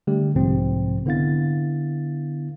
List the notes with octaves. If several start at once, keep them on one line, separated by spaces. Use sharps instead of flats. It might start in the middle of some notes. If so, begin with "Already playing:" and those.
D3 G3 A3 G4
B1 G#2 C3 F3 C4
D3 B3 E4 F5 A6